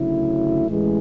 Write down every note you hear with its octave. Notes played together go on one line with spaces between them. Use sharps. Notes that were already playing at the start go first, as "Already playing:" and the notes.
Already playing: D2 C#3 F#3 A3 E4
A1 A2 E3 G#3